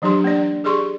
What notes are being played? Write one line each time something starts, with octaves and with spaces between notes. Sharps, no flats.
E3 F#3 D4 G4 C6
A#3 D4 D5
G4 G#4 D5 C6 C#6